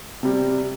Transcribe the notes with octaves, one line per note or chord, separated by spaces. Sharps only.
C3 G3